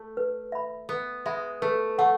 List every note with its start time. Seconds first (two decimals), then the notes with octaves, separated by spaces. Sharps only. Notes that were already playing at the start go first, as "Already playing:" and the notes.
Already playing: A3
0.17 B4
0.52 E5 B5
0.89 B3 B4
1.26 G#3 E5 B5
1.62 A3 B4
1.98 A3 F#5 A5 C#6